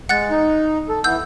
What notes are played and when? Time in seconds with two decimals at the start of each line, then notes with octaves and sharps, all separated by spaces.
0.09 G#3 F#5 F#6 A6
0.31 D#4
0.89 A4
1.04 E3 B3 E6 G6